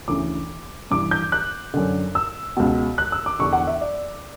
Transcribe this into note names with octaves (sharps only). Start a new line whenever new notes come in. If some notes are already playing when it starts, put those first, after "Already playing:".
D2 C#3 E3 D6
G2 E3 D6
G6
F#6
F#2 D3
E6
C#2 B2
F#6
E6
D6
E2 D3 C#6
F#5
E5
D5